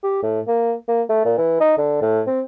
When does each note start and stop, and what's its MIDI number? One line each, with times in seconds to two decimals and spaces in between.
0.03 0.18 67
0.23 0.40 45
0.47 0.73 58
0.88 1.02 58
1.09 1.24 57
1.25 1.37 46
1.38 1.57 52
1.60 1.77 63
1.78 2.01 50
2.02 2.21 45
2.27 2.41 60